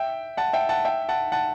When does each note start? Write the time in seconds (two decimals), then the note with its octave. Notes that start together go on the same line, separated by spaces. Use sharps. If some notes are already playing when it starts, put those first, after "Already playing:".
Already playing: E5 G5
0.37 F#5 A5
0.53 E5 G5
0.69 F#5 A5
0.85 E5 G5
1.09 F#5 A5
1.32 F#5 A5